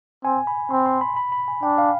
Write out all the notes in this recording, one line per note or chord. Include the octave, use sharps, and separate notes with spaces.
C4 G#5
B5
C4 C6
C6
B5
B5
B5
G#5
D4 G5
F5